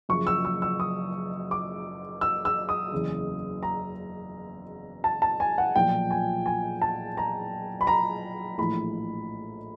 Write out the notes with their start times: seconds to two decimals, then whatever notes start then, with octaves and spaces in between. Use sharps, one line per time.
0.09 F#1 F#2 C#3 F3 C#6
0.27 E6
0.45 E6
0.62 E6
0.80 D#6
1.51 D6
2.21 E6
2.45 E6
2.69 D#6
2.92 F#1 E2 C#3 E3
3.63 A#5
5.04 A5
5.22 A5
5.40 G#5
5.58 F#5
5.76 B1 A#2 F3 G5
6.11 G#5
6.46 G#5
6.82 A5
7.17 A#5
7.81 B5
7.87 A#5
8.58 A#1 A2 E3 B5